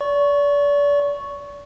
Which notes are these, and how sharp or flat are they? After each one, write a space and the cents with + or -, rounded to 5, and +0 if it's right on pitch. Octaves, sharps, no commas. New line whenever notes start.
D5 -35 C#6 +0